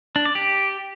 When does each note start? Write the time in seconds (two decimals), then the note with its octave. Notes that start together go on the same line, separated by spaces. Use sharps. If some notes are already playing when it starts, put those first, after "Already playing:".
0.16 D4
0.26 D5
0.35 G4